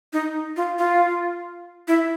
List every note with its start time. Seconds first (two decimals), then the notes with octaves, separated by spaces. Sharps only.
0.13 D#4
0.57 F4
0.79 F4
1.88 E4